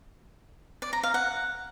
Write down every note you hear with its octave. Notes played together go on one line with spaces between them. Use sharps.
D5
A#5
F5
F#5